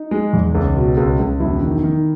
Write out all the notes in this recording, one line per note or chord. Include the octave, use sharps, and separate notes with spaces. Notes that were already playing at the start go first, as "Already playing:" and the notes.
Already playing: D#4
G#3
E2
C#2
B2
C#2
C#2
E1 E4
D#3
D#3